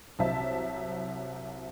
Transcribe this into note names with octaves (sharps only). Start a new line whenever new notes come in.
C2 F#3 C5 E5 A5